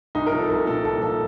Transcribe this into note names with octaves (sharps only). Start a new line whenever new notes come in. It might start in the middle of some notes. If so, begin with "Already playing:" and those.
C2 D#4
A#4
F3
A4
C2 A#4
A#2 A4
C2 A4
F3 A4